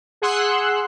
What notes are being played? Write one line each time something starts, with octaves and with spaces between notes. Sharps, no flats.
G#4 F#5 C6 E6 F#6